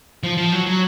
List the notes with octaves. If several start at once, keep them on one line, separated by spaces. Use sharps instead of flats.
F3
F3
F#3
F#3